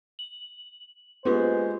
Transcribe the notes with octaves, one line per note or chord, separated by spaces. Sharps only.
F#7
G#3 A#3 B3 F4 G4 C5